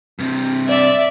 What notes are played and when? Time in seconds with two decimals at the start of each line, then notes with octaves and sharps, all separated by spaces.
0.19 G2 C3
0.69 D5 E5